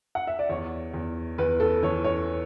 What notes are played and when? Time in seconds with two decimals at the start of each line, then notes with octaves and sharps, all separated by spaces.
0.15 F#5
0.27 E5
0.39 D5
0.49 E2 C#5
0.94 E2
1.38 E2 B4
1.60 A4
1.83 E3 C#5
2.04 C#5